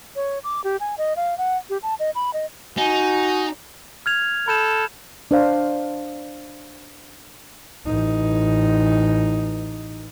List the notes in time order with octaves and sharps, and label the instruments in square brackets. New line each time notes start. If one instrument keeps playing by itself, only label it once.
[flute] C#5
D6
G4
G#5
D#5
F5
F#5
G4
A5
D#5
B5
D#5
[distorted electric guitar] D#4 [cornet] F#4 [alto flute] G#5
[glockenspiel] F6 G#6 F7
[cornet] A4 [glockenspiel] B5 G6 E7
[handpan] D4 C5 F5
[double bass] A1 D#4